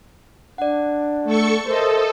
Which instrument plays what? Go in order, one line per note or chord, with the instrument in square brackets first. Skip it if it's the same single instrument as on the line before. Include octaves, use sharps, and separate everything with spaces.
[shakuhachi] D4 [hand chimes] D5 F#5
[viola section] A3 [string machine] A4 C#6 C#7
[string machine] A4 [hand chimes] A#4 [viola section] C5 D#5 [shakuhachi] E5